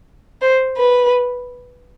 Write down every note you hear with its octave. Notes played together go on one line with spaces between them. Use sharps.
C5
B4